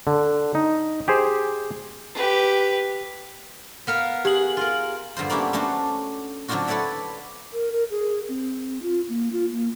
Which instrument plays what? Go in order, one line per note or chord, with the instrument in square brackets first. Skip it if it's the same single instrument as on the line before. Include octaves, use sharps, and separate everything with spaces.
[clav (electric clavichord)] D3
D#4
G4 G#4 C5
[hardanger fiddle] G4 B4
[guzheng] B3 A#4 F5
[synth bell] G4 F#7 [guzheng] G#4
[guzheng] F4 A#4
G2 D3 F4 C5
A#3 B3 C#4 D4 E4 G4
A3 C#4 D4 F#4 C5
D3 F#3 C4 D4 F4 F#4
E4 A4 B4 C#5 D5 E5
[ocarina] A#4
A#4
G#4
C4
F4
A#3
F4
A#3